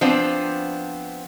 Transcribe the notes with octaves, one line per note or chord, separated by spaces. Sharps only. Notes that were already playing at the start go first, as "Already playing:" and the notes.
F3 B3 C4 D4 C5